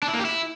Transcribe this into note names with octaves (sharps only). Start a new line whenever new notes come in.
D4
E4
A#3
G4
E4